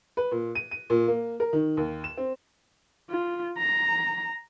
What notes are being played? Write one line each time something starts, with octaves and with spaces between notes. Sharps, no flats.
B4
A#2
D#7
D#7
A#2
A#3
A#4
D#3
D#2
E7
C4
F4
A#5